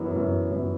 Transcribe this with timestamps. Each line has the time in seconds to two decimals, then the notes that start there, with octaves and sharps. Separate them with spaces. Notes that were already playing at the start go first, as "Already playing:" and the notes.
Already playing: F#2 E3 B3
0.11 F#2 E3 B3
0.51 F#2 E3 B3